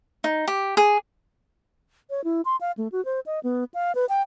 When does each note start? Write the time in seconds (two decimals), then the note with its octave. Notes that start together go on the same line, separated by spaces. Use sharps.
0.24 D#4
0.48 G4
0.77 G#4
2.10 C#5
2.24 E4
2.45 C6
2.61 F5
2.78 A3
2.92 F#4
3.05 C5
3.26 D#5
3.44 B3
3.74 F5
3.95 B4
4.09 G5